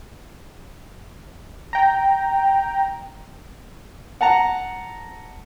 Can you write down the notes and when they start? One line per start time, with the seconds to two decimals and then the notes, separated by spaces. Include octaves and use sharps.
1.73 G5 A#5
4.21 F#5 A5 A#5